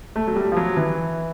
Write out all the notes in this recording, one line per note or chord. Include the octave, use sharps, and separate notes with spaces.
A3
F#3
G3
F3
F#3
E3